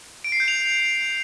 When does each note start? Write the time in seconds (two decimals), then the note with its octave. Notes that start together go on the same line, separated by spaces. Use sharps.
0.24 D7
0.32 C7
0.40 G6
0.48 F7